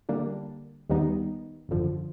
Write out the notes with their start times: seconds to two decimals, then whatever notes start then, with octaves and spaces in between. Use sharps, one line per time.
0.09 D3 G3 A#3 D4
0.90 D#2 D#3 G3 B3 D#4
1.69 G#1 F#2 D3 F3